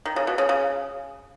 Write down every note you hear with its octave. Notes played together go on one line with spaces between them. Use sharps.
D#3
C#3
B2
C#3
C#3